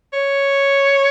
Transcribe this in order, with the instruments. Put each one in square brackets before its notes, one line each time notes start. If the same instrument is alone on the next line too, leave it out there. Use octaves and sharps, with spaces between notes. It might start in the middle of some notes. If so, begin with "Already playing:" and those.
[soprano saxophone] C#5